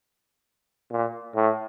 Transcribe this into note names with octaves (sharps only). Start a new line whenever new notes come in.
A#2
A2